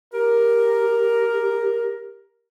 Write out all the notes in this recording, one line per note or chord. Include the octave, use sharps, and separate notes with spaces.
G4 A#4